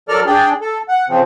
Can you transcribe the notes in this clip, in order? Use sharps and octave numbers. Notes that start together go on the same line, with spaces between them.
F#3 A4 A#4 D5 F6
D4 G#4 D5 G5
A4
F#5
C#3 F3 C4